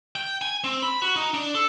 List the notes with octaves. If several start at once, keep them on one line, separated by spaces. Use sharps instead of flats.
G5
G#5
C4
B5
F#4
D#4
D4
A4